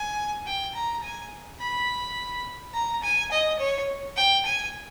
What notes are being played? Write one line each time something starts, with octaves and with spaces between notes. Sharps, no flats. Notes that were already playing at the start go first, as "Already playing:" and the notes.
Already playing: G#5
G5
A#5
G#5
B5
A#5
G#5
D#5
C#5
G5
G#5